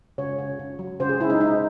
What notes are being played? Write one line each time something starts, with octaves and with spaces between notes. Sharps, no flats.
C#3 C#5
C#3
C#3
F#3
C#3 C5
G#4
C#3 E4
D#4
C#3 D#4